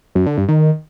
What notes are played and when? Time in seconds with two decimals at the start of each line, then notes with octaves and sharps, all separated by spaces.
0.15 F#2
0.26 D3
0.37 G2
0.49 D#3